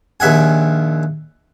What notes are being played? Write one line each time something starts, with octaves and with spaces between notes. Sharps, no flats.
A#1 D#2 E5 F#5 G#5